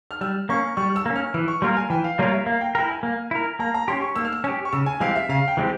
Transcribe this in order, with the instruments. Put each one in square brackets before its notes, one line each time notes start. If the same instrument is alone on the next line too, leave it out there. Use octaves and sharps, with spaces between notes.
[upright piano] F6
[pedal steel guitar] G3 [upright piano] E6
[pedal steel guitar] A#3 C#4 [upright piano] C#6
[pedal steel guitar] G3 [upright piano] C#6
[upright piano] E6
[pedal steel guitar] A#3 C#4
[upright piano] F6
[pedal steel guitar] E3 [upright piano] E6
[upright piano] C#6
[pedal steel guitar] G3 A#3 F4 A#4 [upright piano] C6
[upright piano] G#5
[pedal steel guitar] E3 [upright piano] G5
[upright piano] F5
[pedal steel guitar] G3 A#3 F4 A#4 [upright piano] C#5
[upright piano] E5
[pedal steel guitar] A#3 [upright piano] F5
[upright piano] G5
[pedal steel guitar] E4 A#4 [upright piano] G5
[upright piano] G#5
[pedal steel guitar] A#3
E4 A#4
[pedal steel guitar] A#3 [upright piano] A#5
[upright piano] A#5
[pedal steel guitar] C#4 G4 [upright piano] C6
[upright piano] C#6
[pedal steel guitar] A#3 [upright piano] E6
[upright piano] F6
E6
[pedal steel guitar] C#4 G4 [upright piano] E6
[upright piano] C#6
[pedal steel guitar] C#3 [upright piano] E6
[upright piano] G#5
[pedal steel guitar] E3 G#3 C4 G4 [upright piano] F5
[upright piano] E5
[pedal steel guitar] C#3 [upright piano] F5
[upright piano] G5
[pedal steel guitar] E3 G#3 C4 G4